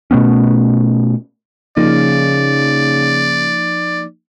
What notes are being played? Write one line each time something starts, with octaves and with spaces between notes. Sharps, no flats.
B2 A3 B3 C#4
C#3 F3 A#3 D#4 D5